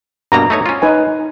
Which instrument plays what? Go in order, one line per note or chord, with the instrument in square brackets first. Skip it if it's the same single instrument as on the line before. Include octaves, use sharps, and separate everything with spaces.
[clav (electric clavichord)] G2 B2 A#3 [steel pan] A#5
[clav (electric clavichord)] A3 D#4 C#5
C#4 F4
[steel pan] D#4 B4 G#5